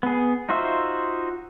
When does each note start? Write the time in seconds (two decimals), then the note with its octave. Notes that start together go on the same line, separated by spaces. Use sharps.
0.03 B3 G#4
0.49 D#4 F4 F#4 C5 E5